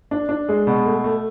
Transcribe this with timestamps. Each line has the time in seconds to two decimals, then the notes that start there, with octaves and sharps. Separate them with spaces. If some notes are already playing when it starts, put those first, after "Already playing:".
0.11 D4
0.29 D4
0.49 G#3
0.67 B2
0.86 A3
1.04 A3